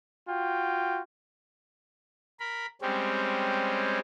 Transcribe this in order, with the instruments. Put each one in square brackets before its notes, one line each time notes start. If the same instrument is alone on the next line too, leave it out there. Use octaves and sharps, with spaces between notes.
[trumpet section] F4 F#4 G5
[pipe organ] A#4 B5
G3 G#3 C4 C#4